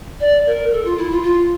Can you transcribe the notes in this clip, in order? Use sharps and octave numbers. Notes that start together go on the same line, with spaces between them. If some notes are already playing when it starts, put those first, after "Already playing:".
D5
A#4
A4
F4
E4
F4
F4